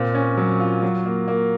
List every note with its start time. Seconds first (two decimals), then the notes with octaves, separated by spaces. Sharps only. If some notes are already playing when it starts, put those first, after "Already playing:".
Already playing: A#2 C4
0.15 C#4
0.37 F#3
0.60 F4
0.82 F#3
1.06 A#3
1.28 A#3